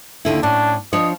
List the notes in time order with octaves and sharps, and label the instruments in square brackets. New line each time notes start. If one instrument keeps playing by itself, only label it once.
[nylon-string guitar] D#2 D3 E4
[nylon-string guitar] A2 C#4 [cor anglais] D4
[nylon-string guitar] F3 D4 C#5 [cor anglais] D#5